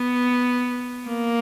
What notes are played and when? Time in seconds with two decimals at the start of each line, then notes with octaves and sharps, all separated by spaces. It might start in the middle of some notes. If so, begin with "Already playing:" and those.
Already playing: B3
1.08 A#3